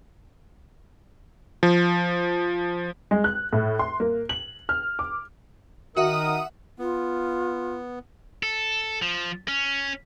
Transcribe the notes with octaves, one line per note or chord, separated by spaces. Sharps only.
F3
G#3
F#6
A2
C6
A#3
F#7
F6
D6
D#3 F#4 A#4 E5 F#5 D#6
B3 F4
A4
F3
C#4